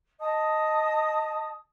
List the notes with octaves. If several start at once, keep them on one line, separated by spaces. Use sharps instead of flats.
D#5 A5 D#6